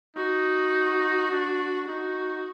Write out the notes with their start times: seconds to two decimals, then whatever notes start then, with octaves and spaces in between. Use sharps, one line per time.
0.17 D#4 F#4
1.31 D4
1.88 D#4 F#4